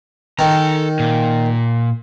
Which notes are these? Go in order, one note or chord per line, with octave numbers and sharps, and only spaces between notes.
D#3 A4 A#5
A#2